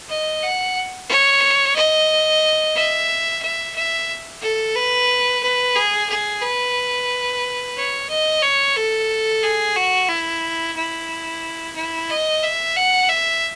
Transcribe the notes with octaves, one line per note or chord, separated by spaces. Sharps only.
D#5
F#5
C#5
D#5
E5
E5
E5
A4
B4
B4
G#4
G#4
B4
C#5
D#5
C#5
A4
G#4
F#4
E4
E4
E4
D#5
E5
F#5
E5